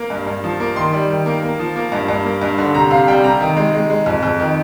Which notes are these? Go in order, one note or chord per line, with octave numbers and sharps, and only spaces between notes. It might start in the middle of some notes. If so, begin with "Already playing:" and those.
Already playing: A#3
G2
G2
F3
A#3
D#3 C6
G3
D#3
A#3
A#3
F3
A#3
G2
G2
A#3
G2
D3
C3 A#5
C3 F5
G3 G5
C3 A#5
D#3
G#3
G#3
G#3
F2
F2
D#3